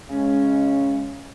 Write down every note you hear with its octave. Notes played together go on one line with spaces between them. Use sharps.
C#3 G#3 C#4